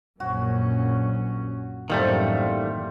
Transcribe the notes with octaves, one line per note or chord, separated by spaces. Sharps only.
A#1 F#2 C#4 F#4
A1 F#2 D#3 G3 A3 A#3 C4